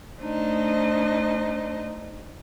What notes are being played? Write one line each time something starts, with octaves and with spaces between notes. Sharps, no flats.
A3 D4 D#4 C5 D#5